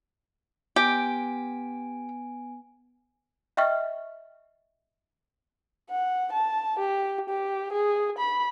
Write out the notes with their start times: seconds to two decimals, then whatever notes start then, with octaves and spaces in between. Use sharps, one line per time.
0.76 B3 G4 G#5 D7
3.57 D#5 E5 G5 C#6 F6
5.90 F#5
6.32 A5
6.78 G4
7.29 G4
7.72 G#4
8.18 B5